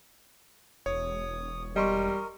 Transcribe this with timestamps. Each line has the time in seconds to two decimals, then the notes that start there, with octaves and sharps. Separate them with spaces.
0.86 E1 C#5 D#6
1.76 G3 A#4 D#5 C6 C#6